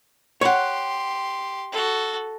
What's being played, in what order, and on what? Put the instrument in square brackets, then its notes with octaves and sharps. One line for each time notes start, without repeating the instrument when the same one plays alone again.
[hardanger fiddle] G4 C6 [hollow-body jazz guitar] C#5 F#5
[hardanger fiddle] F#4 A4